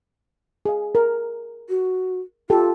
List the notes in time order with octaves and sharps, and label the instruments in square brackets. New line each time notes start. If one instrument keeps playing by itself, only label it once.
[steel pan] G#4 F5
A#4
[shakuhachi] F#4
[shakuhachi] F4 [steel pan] G4 A4